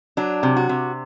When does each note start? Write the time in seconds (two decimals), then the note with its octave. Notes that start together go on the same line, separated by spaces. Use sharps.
0.17 F#3 D4
0.43 C3
0.56 F#4
0.69 C3